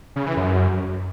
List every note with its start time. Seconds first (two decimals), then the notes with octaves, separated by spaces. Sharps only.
0.16 C#3
0.26 E3
0.37 F#2